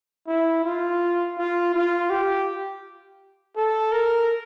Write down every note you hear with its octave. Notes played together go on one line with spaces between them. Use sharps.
E4
F4
F4
F4
G4
A4
A#4